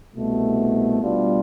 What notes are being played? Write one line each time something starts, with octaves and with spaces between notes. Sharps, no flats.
C2 B2 A3
B2 G3 D4 F4